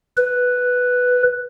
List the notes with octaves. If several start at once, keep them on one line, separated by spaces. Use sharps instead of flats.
B4